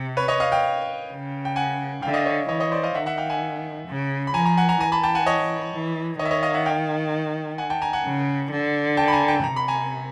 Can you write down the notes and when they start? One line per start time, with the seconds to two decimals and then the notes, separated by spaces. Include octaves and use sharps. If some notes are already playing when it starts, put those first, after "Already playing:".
Already playing: C3
0.17 B4 C#5
0.28 C#5 D#5
0.40 D#5 F5
0.52 F5 G5
1.10 C#3
1.45 G5
1.56 F#5 G#5
2.02 D3 F5 G5
2.08 E5
2.14 D#5 F5
2.26 C#5 D#5
2.49 E3 C#5 D#5
2.60 C#5 D#5
2.72 C5 D5
2.83 D#5 F5
2.95 D#3 E5 F#5
3.06 E5 F#5
3.18 F5 G5
3.30 F#5 G#5
3.87 C#3
4.27 B5
4.34 F3 G#5 A#5
4.45 G#5 A#5
4.57 F#5 G#5
4.69 G#5 A#5
4.80 E3 G#5 A#5
4.92 A5 B5
5.03 G5 A5
5.15 F#5 G#5
5.26 C#5 D#5
5.73 E3
6.19 D#3 C#5 D#5
6.25 E5
6.31 C#5 D#5
6.43 D#5 F5
6.54 E5 F#5
6.65 F5 G5
7.58 F#5 G#5
7.70 G5 A5
7.82 G#5 A#5
7.93 F#5 G#5
8.05 C#3
8.51 D3
8.97 G5 A5
9.08 B5
9.13 G#5 A#5
9.28 G5 A5
9.44 C3 A#5
9.56 B5
9.68 G#5 A#5